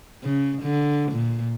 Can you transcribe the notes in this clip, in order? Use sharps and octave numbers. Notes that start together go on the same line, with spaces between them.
C#3
D3
A#2